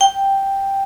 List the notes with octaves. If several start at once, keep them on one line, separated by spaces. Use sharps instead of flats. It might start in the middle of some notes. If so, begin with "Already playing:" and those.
G5